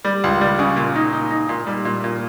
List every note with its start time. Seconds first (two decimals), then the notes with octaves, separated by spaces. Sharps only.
0.04 G3
0.24 C#2
0.41 G3
0.59 C#3
0.77 A#2
0.96 D#4
1.13 D#4
1.31 D#4
1.49 A#2
1.67 G3
1.85 A#2
2.04 A#2